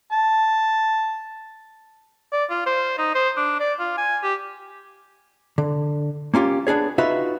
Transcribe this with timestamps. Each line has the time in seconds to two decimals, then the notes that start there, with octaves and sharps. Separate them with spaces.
0.13 A5
2.33 D5
2.50 F4
2.66 C5
2.98 D#4
3.15 C5
3.37 D4
3.60 D5
3.79 F4
3.97 G#5
4.23 G4
5.58 D3
6.34 A#3 C#4 F4 G4
6.67 B3 D4 G#4 C#5
6.98 D#4 F4 F#4 B4 E5